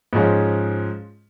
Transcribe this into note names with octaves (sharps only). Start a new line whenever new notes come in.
G#2 F3 G#3 C#4